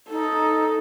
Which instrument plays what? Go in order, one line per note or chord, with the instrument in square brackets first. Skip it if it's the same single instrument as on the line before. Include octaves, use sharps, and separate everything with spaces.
[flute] D#4 [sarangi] A4